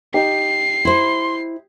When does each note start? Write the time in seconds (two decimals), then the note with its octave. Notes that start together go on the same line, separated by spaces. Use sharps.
0.14 D#4 G4 C7
0.85 E4 C5 C6